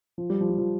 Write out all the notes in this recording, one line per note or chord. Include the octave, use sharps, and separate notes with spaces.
F3
G3
F3
G3
F3